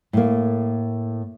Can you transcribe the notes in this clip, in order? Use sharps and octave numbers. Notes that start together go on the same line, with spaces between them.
A2 A#3